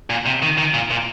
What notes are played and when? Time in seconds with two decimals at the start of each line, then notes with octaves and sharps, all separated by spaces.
0.10 A#2
0.26 C3
0.42 D#3
0.58 D#3
0.74 A#2
0.91 A#2